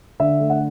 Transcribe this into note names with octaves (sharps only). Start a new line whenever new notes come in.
D3 E5
A3
F#5